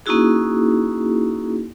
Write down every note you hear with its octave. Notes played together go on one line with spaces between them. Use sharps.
A#3 C#4 D#4 E4 F#4 G#4